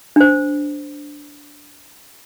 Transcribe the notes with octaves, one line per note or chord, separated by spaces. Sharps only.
D4 C5